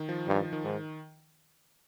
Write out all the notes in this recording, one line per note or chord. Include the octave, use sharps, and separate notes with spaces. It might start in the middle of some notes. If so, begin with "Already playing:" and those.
Already playing: D#3
F3
G2 D#3
D#3
G#2